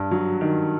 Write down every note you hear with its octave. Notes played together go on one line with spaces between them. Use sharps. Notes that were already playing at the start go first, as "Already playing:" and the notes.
Already playing: G2
F#3
D#3